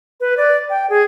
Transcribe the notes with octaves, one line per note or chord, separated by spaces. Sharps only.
B4
D5
G5
G#4